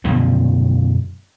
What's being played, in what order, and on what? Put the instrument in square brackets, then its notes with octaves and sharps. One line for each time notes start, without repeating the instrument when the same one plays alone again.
[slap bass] F#2 B2 D3 F3